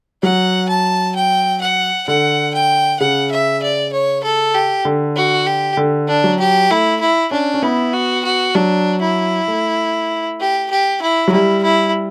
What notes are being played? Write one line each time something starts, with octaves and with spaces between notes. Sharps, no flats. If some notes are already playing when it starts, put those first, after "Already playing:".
F#3 F#5
A5
G5
F#5
D3 F#5
G5
C#3 F#5
E5
D5
C#5
A4
G4
D3
F#4
G4
D3
D4
F#3
G4
A3 E4
E4
C#4 D4
C#4
B3 E4
F#4
F#4
F#3 D4
E4
A3
G4
G4
E4
F#3
G3 E4
E4